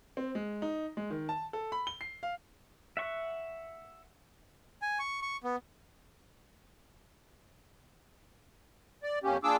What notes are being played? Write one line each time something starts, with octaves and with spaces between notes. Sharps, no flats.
C4
G#3
D#4
G#3
D#3
A5
A4
B5
G7
C7
F5
E5 F#5 C#6
G#5
C#6
C#6
B3
D5
F2 A#3 C#4 G4
A#3 D4 F4 G#4 D6 E6